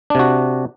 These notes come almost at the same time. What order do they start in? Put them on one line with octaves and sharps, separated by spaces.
D4 C3 F#4